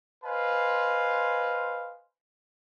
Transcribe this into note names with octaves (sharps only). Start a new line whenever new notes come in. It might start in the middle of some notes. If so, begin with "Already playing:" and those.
B4 C5 D#5 F5 G#5 C6